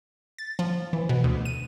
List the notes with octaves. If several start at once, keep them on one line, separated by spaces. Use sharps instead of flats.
A6
F3
E3
B2
D2
D#7